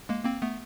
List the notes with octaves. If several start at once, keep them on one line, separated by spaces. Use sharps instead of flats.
G#3 A#3
A#3 C4
A3 B3